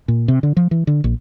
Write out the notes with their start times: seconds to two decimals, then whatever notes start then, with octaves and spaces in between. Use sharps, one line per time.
0.08 A#2
0.28 C3
0.43 D3
0.57 F3
0.71 E3
0.87 D3
1.04 A#1